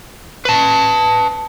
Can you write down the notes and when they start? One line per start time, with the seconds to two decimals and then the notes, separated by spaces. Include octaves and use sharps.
0.45 B4 A5